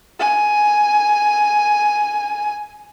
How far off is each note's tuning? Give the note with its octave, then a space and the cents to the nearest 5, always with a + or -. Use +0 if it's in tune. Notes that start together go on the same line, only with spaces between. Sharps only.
G#5 +5